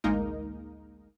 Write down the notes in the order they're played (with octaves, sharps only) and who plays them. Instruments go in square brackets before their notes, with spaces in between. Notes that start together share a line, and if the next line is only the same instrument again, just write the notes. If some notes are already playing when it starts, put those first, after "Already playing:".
[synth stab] A1 D2 G#3 A#3 D#4 A#4